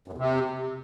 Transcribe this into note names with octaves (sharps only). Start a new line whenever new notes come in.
F#2
E2
C3